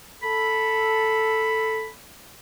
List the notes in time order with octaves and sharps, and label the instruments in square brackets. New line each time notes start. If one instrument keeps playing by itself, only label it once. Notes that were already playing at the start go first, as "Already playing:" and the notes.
[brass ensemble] A4 [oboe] B5